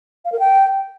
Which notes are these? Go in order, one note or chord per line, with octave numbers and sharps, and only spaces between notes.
F5
A#4
G5